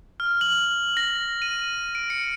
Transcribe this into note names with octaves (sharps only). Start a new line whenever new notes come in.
F6
F#7
A#6
D#7
D7
C#7